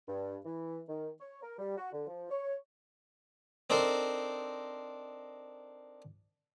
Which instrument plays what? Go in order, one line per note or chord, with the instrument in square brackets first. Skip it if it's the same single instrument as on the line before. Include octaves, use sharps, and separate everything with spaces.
[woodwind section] G2
E3
D#3
C#5
A#4
G3
F#4
D3
F3
C#5
[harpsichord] C4 D4 D#4 A4 A#4 C5